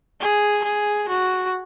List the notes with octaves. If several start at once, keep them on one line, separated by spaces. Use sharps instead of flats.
G#4
G#4
F#4